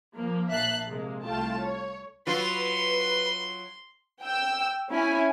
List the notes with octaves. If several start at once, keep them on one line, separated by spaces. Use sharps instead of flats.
F3 A#3
A#1 A#3 E5 A5 F#6 C7
C3 G#3 A#3
C2 A3 F4 G5 A5
C#5
F#3 F4 B4 C6
G5 E6
C#4 E4 G#5